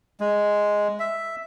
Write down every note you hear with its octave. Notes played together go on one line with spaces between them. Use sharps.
G#3
E5